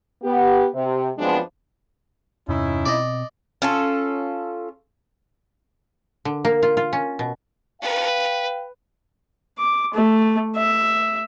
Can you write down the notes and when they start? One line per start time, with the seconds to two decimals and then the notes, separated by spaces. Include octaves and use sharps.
0.23 B3 G4
0.74 C3
1.18 F#2 F3 G#3 B3 C4 D4
2.49 E2 G2 C3 C#4 D#4 E4
2.86 B2 C4 D5 D#5
3.62 C#4 F4 A4
6.25 D3
6.45 A#3
6.63 F4
6.77 F4
6.93 C#4
7.19 B2
7.81 B4 F5 G5
9.58 D6
9.94 A3
10.56 E5